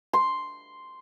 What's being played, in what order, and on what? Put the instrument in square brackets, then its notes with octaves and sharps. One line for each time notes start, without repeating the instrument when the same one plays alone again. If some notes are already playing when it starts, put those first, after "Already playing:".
[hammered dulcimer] C6